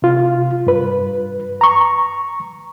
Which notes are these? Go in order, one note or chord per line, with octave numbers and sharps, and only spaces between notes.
C3 F4
G2 B4
A#5 C#6